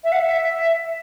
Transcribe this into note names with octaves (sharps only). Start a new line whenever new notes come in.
E5
F#5
E5